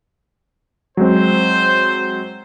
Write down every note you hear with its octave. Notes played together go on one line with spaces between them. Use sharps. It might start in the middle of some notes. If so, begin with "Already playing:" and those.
F#3 G#3 C4 C5